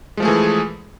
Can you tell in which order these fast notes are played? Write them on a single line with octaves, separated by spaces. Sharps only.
G#3 F3 A3 G#4 E3